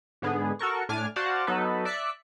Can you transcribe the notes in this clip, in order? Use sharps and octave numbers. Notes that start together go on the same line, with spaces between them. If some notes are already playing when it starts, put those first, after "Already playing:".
G#2 D3 B3 G#4
F#4 A4 A#4 C#6
A2 D4 G#5 D6 F6
F#4 C5 D5 F5 F#5 A5
F#3 B3 D#4 A4 B4
D5 E5 F#6 B6 C#7